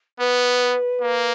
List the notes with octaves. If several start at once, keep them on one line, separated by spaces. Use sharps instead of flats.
B3 B4
A#3